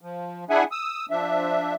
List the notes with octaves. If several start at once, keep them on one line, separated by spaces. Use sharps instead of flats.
F3
D4 E4 G#4 E5 F#5 G#5
D#6 E6
F3 D4 E5